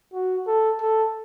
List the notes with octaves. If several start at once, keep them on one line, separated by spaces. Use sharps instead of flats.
F#4
A4
A4